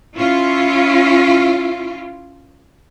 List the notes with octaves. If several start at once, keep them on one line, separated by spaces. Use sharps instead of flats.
C#4 E4 F4